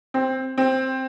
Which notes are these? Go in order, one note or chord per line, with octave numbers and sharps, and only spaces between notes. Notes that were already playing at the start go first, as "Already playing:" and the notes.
C4
C4